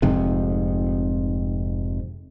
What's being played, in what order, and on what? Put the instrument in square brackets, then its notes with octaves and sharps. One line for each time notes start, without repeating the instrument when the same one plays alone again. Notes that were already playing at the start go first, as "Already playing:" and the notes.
[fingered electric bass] F1 F2 G#2 C3